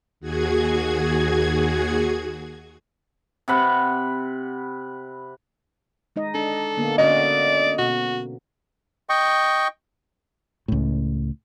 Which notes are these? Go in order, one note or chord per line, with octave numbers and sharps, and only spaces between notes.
D#2 F#4 G#4 G#6
C3 F#5 B5
G#3 D#4 D#5
D4 A4
D3 A#3 B3
D3 C#4 F#4 D5 D#5
B2 F#4
D#5 G5 C#6
C#2 A2